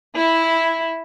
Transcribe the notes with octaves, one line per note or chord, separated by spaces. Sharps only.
E4